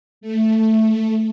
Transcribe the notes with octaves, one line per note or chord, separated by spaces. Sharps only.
A3